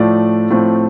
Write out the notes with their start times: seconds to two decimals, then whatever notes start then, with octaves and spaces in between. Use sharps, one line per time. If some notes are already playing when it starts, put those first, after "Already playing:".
Already playing: A2 F3 A3 D5
0.51 A2 F3 A3 C4